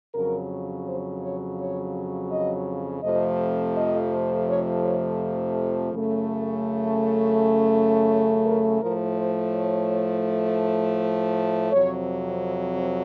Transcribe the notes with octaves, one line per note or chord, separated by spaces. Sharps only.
F2 C#3 F#3 A#4
C5
C#5
C#5
D#5
F2 C3 F3 A3 D#5
D#5
C#5
C#5
F#2 C#3 A3
C#5
A#4
A2 F3 A3 A#4
C5
C#5
F2 C3 F#3 C#5
C5